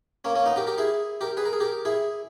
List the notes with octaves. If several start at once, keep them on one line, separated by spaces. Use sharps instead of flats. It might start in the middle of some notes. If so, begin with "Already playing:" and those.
A#3 C#4
A#3 C#4
B3 D#4
G4 A#4
G4 A#4
E4 G#4
G4 A#4
G#4 B4
A#4
G#4
G4 A#4
E4 G#4